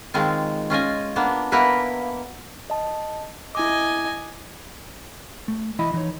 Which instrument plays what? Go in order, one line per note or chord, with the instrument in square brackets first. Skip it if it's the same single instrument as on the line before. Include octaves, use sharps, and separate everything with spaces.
[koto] D#3 G#3 C4 F4
C#4 F4 D#5 G#5
A#3 B3 D4
A#3 B3 E4 A#4 B4
[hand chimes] D#5 A5
[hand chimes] E4 D6 [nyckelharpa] D#5 G#5
[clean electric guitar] A3
E3 E4 D#5 B5
E3 D#4 E4 C#5